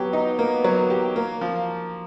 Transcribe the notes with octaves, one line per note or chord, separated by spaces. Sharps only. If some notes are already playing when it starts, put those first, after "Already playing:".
Already playing: F#3 B3 G4
D#4
A#3
F#3
G4
A#3
F3